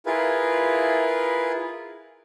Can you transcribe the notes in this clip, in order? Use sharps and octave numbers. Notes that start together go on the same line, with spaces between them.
E4 F4 G#4 A#4 B4